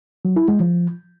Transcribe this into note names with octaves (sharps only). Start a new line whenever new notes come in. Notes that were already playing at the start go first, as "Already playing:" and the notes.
F#3
E4
G#3
F3